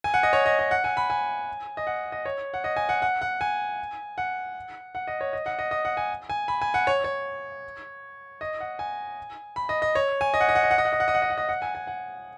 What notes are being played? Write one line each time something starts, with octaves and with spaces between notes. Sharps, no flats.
G#5
F#5
D#5
C#5
D#5
D#5
F#5
G#5
B5
G#5
D#5
F#5
D#5
C#5
F#5
D#5
G#5
F#5
F#5
F#5
G#5
F#5
F#5
D#5
C#5
D#5
F#5
D#5
D#5
F#5
G#5
G#5
B5
G#5
F#5
C#5
C#5
D#5
F#5
G#5
B5
D#5
D#5
C#5
G#5
D#5
F#5
D#5
F#5
D#5
F#5
D#5
F#5
D#5
F#5
D#5
F#5
D#5
F#5
D#5
F#5
G#5
G#5
F#5